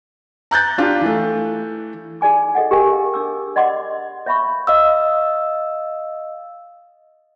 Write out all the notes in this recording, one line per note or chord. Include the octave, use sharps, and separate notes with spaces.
A#5 F#6 G6 A6
D4 F4 G4
E3 A3
D#4 G#4 D5 G#5 D6
G#4 A4 D#5 F#5
G4 G#4 A#4 F5 G5 G#5
D4 D6 E6
D5 D#5 F#5 C6 D6
C#5 E5 F5 B5 C#6
D#5 F5 E6